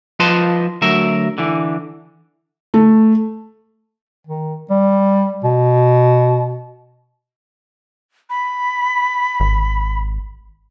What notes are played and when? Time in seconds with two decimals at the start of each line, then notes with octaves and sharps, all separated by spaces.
0.19 F3 F4 B4 D#5 A5 C6
0.82 D2 F#3 A#4 E5
1.38 D3 E3
2.74 A3
4.27 D#3
4.71 G3
5.44 B2
8.30 B5
9.40 G#1